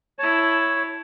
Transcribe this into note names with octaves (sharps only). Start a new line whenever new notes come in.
E4 C#5 A5